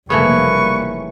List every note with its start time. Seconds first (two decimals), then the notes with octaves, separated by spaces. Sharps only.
0.10 F1 C#3 E3 G3 A3 A#3 B4 C#6